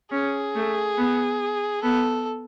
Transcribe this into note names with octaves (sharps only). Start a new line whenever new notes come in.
C#4 G#4
A3
B3
B3 A4